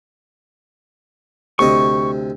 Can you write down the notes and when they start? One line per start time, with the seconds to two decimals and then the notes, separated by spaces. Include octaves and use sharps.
1.59 D2 C3 D#5 C#6